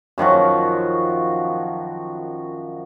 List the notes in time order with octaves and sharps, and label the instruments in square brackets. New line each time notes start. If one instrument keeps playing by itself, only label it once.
[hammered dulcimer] F#2 D#3 F3 F#4